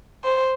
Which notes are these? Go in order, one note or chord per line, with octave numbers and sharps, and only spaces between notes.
C5